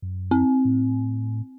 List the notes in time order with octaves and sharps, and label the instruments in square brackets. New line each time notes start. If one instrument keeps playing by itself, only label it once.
[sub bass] F#2
[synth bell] C4
[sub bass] A2